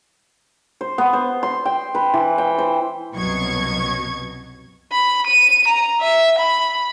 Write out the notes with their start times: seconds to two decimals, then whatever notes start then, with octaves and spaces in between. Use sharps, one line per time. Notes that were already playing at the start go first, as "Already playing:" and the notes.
0.81 C5
0.98 B3
1.13 C5
1.43 C6
1.65 G5
1.95 B4
2.14 E3
2.38 G5
2.58 C5
3.13 C2 F#2 B2 F#3 C#6 G#6
4.92 B5
5.27 D#7
5.68 A#5
6.01 E5
6.38 B5